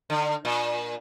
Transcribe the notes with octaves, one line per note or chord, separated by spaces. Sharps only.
D3
A#2